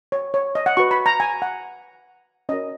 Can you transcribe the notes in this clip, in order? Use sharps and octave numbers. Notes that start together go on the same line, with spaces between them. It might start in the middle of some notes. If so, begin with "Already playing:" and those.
C#5
C#5
D#5
F#5
F#4 B4 C#6
B5
A#5
G#5
F#5
C#4 F#4 A#4 D#5